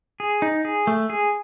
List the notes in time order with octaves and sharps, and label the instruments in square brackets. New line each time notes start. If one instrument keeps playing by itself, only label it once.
[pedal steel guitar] G#4
D#4
G#4
A3
G#4